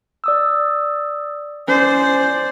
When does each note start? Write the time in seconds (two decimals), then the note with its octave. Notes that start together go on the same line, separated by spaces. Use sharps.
0.24 D5 D#6 E6
1.68 C#4 C5 D5 C7